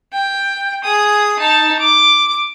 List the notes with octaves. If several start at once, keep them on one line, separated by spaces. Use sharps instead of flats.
G5
G#4 D#6
D#4 A5
D6